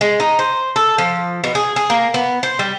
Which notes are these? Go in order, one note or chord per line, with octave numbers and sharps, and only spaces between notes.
G#3
D#4
C5
A4
F3
B2
G#4
G#4
A#3
B3
C5
G3